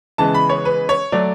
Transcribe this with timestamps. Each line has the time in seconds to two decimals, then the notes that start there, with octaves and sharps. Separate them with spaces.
0.18 C#3 E3 G#3 B3 A5
0.34 B5
0.49 C#5
0.65 B4
0.89 C#5
1.12 F#3 A3 D5